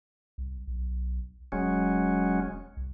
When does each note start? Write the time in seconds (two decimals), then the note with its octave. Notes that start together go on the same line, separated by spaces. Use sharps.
0.38 C2
0.67 B1
1.52 E1 F#3 G#3 C#4
2.77 C2